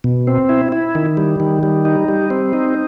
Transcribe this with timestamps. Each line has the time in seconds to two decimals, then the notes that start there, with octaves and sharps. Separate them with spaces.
0.04 B2
0.27 C4
0.49 E4
0.72 E4
0.95 D#3
1.17 G3
1.40 D#3
1.63 G3
1.85 D#4
2.08 G3
2.30 C4
2.53 D#4